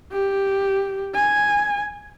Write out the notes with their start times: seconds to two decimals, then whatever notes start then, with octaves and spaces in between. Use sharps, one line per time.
0.13 G4
1.15 G#5